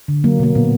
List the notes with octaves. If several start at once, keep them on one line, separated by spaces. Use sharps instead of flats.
D3
F#3 A#3
B2 A#3
A#2 B3